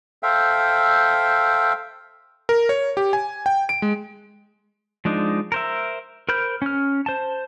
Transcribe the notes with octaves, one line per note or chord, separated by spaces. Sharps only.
A4 C5 E5 F5 G5
A#4
C#5
G4
G#5
G5
D7
G#3
F3 G#3 D4 D#4
A#4 C5 E5
A#4 C5 B5 F6 G6
C#4 F6
C5 A5